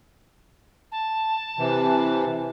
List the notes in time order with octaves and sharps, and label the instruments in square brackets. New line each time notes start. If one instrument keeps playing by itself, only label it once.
[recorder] A5
[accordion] C3 E3